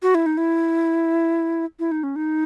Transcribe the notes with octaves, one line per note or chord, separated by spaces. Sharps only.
F#4
E4
D#4
E4
E4
D#4
C#4
D#4